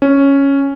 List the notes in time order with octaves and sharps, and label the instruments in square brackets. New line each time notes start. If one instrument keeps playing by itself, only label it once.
[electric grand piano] C#4